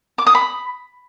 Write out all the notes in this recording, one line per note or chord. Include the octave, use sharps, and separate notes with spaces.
D6
D#6
B5